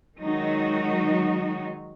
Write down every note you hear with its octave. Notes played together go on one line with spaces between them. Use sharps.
D#3 F#3 G#3 D#4 F#4